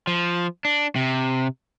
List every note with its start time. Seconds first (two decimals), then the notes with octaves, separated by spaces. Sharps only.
0.07 F3
0.65 D4
0.96 C3